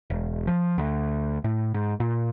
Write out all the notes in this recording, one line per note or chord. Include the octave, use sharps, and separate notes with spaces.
E1
F3
D2
A2
G#2
A#2